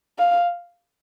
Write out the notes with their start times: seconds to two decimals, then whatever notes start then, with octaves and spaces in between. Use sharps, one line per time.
0.18 F5